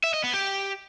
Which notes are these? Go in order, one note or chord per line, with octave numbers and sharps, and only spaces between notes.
E5
D#5
B3
G4